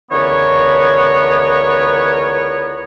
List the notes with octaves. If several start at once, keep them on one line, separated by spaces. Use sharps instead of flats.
C#2 D3 E3 B3 A#4 C#5